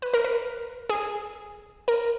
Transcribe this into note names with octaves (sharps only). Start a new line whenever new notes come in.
B4
A#4
B4
G#4
A#4